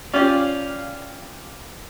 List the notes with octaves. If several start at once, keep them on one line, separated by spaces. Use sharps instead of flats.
C#4 F4 G4 D5 F5